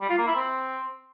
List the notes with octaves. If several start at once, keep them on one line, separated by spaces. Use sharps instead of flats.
G3
F4
A#3
E4
C4